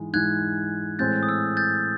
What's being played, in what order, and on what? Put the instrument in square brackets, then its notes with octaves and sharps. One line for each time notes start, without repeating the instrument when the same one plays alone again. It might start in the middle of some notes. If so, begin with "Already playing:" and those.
Already playing: [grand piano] G#2 E3 G#3
[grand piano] G#2 E3 G#3 [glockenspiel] F#6 G#6
[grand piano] A2 E3 G#3 C4 [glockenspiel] G6 A6
[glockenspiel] D#6
E6
G6 A6